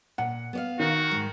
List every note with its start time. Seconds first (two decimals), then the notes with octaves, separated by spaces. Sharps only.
0.18 A#2 F#5
0.53 B3 D5 F5
0.80 D#3 F#4
1.11 G#2 G#3